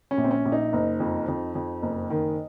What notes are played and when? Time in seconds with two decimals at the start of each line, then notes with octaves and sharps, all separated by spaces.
0.11 C#4
0.18 A#1
0.24 C4
0.31 C#4
0.45 A#1
0.52 D#4
0.73 F#1
1.00 F2
1.28 F2
1.55 F2
1.82 F#1
2.10 D#3